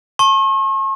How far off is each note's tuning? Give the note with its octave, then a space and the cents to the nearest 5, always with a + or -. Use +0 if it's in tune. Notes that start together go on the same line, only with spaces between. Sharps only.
A5 +0 C#6 -45